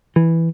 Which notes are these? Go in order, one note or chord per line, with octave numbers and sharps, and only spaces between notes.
E3